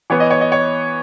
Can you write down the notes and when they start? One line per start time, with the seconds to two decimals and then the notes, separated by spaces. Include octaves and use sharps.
0.10 E3 B3 C#5
0.20 D#5
0.30 C#5
0.41 D#5
0.52 C#5